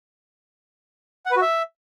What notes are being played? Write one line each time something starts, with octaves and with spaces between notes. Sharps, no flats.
F#5
B4
F#4
E5